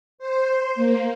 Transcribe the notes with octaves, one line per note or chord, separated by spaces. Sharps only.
C5
A#3